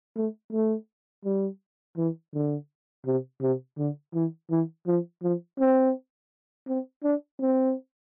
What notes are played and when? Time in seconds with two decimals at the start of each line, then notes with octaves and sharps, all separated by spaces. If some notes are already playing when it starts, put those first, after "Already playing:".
0.17 A3
0.53 A3
1.25 G3
1.97 E3
2.34 D3
3.06 C3
3.41 C3
3.78 D3
4.14 E3
4.51 E3
4.87 F3
5.23 F3
5.59 C4
6.68 C4
7.04 D4
7.40 C4